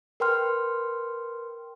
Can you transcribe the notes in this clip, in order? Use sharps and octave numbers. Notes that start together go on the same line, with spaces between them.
A#4 B4 G5 C6 F6